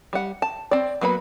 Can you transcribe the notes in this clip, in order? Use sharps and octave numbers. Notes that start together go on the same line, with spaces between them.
G3 F#5
A5
C4 D5
F#3 A#3 B3 B4 B5